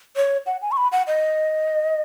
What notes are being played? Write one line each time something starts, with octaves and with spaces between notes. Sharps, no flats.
C#5
F#5
G#5
C#6
B5
F#5
D#5